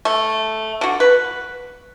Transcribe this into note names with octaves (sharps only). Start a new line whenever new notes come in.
A3
D3 F#4
B4